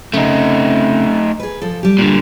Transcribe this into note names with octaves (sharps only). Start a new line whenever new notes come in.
C#3 A3 C4 D#4 A#4
G#4 B4
F3 A4
G3 G4
A#2 D3